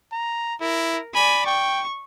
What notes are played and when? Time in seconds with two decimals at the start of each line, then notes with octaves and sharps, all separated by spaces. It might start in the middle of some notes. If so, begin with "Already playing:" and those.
0.12 A#5
0.61 E4 A#4
1.15 D5 G#5 B5
1.46 G5 C#6